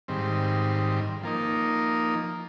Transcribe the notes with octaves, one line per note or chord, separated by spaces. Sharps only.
G#2 D#3 G3 C4
F3 A#3 D#4